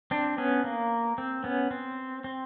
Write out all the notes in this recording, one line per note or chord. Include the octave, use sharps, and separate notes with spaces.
C4 D4
B3 C#4
A#3
C4
B3 C#4
C4
C4